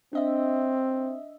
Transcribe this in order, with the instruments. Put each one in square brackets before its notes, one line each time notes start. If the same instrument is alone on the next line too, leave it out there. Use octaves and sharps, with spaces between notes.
[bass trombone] C4 [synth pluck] D4 D#5 E5